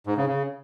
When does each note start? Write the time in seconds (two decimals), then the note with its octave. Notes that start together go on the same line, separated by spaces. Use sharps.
0.07 G#2
0.17 C#3
0.27 C#3